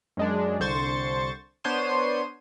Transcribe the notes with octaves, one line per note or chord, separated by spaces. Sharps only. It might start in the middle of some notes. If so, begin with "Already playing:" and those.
F#2 G#3 D4
C2 D3 C5 C#6 A6
B3 D4 C5 C#5 C6 D#7